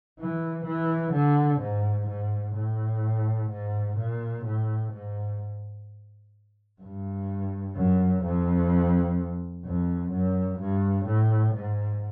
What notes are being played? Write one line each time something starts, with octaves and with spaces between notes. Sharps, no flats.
E3
E3
D3
G#2
G#2
A2
G#2
A#2
A2
G#2
G2
F#2
F2
F2
F#2
G2
A2
G#2